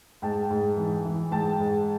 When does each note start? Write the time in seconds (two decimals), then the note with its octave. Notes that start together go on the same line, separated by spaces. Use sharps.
0.22 G#2 G5 A5
0.50 G#2
0.77 E3
1.05 E3
1.31 G#2 G5 A5
1.60 G#2